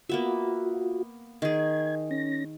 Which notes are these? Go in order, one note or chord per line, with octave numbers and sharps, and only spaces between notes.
A#3 B3 F4 F#4 E5
D#3 G#4 G#6
C#4 A#6